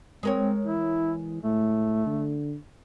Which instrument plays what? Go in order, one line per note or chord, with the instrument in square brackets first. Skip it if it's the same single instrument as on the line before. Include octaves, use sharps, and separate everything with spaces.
[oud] G#3 A#4 C#5 [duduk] C4
[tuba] E3 [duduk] E4
[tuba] A2 [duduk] A3
[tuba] D3